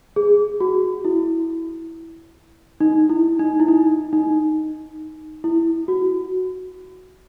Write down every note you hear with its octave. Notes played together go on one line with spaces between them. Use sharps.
G#4
F#4
E4
D#4
E4
D#4
E4
D#4
D#4
E4
F#4